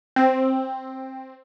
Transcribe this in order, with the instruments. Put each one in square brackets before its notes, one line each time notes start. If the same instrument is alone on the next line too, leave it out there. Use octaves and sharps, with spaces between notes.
[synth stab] C4